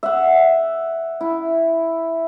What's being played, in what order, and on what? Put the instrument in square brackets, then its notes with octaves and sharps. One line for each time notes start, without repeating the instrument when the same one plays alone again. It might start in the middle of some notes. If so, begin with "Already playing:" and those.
[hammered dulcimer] E5 F#5
E4